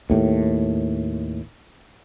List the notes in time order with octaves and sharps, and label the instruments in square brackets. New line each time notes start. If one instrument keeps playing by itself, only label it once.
[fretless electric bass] D#2 A2